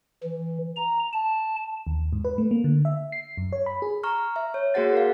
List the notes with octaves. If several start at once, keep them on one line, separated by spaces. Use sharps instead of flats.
E3
A#5
A5
D#2
G#2
B4
A3
A#3
D3
E5
C7
F#2
C#5
B5
G#4
A#5 C#6 F6
E5
C#5
A#3 F#4 G#4 C5 F#5 A6
A#4 F5